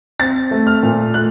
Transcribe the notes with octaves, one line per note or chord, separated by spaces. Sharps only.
C4 A6
A3
F6
A#2
A3 F#6